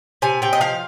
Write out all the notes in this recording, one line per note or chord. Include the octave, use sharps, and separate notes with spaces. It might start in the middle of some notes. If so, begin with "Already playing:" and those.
C3 G#5
C3 G5
D#5
F3 F5